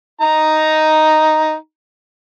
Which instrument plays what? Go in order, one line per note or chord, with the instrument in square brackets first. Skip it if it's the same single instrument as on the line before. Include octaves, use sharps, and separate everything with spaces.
[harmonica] D#4 A#5